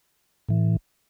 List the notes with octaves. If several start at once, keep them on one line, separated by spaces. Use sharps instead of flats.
A2 E3